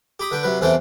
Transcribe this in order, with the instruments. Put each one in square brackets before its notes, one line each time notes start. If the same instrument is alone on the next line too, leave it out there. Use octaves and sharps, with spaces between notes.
[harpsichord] G4 B5 D#6
D3 B4 G5
C3 F#3 B4
E2 C3 E3 C4 A4 G5